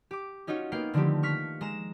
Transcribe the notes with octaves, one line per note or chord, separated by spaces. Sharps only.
G4 D6
C#4 D#4 F4 F#4 C#5
A#3 B3 F5 G5 C7
D3 D#3 F3 A3 C4 G4
C#6 F6 B6
G#3 A#5 E7